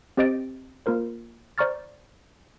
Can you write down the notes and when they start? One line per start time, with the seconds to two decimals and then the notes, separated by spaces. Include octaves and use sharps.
0.17 C4 G4 C5 D#5 A6 D7
0.86 A#3 F4 A#4 C5
1.58 C5 D5 A#5 C#6 F6 A6